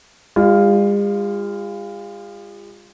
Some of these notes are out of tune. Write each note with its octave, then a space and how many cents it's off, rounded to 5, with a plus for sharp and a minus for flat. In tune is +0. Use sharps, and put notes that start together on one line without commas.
G#3 -45 F4 +0 F5 +0